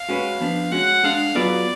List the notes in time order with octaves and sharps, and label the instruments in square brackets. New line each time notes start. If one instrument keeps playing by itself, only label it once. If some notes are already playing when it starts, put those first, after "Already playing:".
Already playing: [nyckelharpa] F5
[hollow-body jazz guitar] G#3 C#4 F#4 B4
F3 B3 D4
[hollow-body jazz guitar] G#3 C#4 F#4 [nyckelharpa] F#5
[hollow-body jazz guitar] G#3 D4 G#4 [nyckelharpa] F5
[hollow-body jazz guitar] F#3 B3 F4 G#4 B4 [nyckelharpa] D5